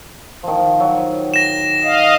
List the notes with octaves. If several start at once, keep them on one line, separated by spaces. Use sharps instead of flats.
D#3 F3
F#3
A#6 E7
D#5 F5